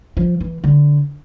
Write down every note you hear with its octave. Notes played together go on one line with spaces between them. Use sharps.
F3
E3
D3